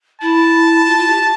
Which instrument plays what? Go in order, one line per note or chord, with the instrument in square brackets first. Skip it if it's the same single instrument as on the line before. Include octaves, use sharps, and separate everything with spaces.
[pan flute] E4 [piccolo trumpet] A5
[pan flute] F4
F4
G4